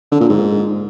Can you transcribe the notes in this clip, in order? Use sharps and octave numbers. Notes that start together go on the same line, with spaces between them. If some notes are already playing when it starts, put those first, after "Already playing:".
D3
A#2
G#2